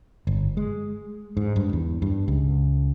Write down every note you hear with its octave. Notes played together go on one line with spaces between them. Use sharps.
G1
G#3
G#2
G2
E2
G2
C#2